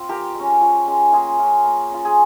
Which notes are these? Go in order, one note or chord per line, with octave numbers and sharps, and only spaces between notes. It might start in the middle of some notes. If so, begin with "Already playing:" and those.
Already playing: C4 F4
F3 G4 A#4
G#3 C#4
F3
G#3 C#4
A#3 F4 G#4
C#4 F4
A#3
C#4 F4
G#4